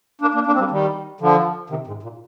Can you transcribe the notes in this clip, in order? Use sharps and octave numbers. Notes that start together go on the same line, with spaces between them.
A#3 D4
A#3 D4
A#3 D4
C4
G3 A#3
D#3 G3
D3 F3
C3 D#3
G#2
A#2